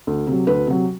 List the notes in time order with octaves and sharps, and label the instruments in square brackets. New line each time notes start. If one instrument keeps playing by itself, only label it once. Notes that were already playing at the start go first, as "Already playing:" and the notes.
[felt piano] D2
C3 F#3
D2 B4
C3 F#3